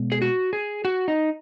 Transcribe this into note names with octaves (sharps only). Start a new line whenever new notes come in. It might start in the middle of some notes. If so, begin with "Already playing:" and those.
Already playing: B2 G#3 B3
G#4
F#4
G#4
F#4
D#4